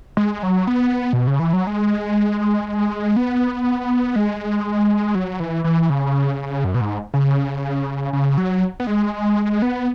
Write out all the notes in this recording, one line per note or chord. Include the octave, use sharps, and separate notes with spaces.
G#3
F#3
B3
B2
C#3
E3
F#3
G#3
B3
G#3
F#3
E3
E3
C#3
F#2
B2
G#2
C#3
C#3
F#3
B3
G#3
B3